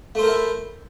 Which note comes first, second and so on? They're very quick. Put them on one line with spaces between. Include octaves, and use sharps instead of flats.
A3 C5 A#4 A4 E4